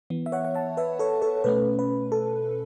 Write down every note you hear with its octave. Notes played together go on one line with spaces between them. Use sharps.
E3 B3
E5
C#5 F#5
F#5
E5 A5
B4 E5
A4 C#5
A4 C#5
B2 A3 C#4 B4
B4
A4